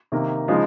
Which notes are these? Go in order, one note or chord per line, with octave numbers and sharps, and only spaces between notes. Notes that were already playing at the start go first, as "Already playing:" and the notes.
C3 D#3 A#3
C#3 F3 G#3 D#4